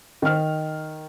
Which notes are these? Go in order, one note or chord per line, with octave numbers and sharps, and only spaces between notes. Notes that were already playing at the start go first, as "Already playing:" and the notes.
D#3 F6